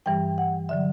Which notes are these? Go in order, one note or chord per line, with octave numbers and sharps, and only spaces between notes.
G2 E3 G3 G5
F#5
D3 F#3 E5